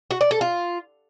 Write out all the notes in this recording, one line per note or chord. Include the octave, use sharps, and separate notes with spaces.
F#4
D5
A4
F4